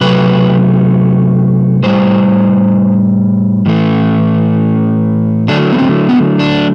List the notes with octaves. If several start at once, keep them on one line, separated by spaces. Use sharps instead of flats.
C3 F#3 A3 B4
A2 G3 C5
A2 E3 A3
D3 F#3 A3 D4
B3
C4
B3
D4